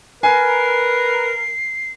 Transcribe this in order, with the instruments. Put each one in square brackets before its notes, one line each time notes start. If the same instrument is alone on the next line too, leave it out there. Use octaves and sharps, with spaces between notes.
[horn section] A#4 [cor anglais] B4 [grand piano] G#5 [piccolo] C7